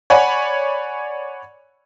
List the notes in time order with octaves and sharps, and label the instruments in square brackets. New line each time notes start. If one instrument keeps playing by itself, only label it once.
[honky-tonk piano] C#5 D5 F#5 G#5 B5